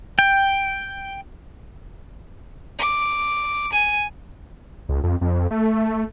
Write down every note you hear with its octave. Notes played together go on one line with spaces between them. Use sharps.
G5
D6
G#5
C#2
F2
F2
A3